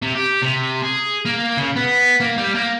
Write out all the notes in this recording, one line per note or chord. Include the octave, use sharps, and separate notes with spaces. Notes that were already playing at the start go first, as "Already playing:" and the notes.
C3
G4
C3
G#4
A#3
C#3
B3
A#3
G3
A#3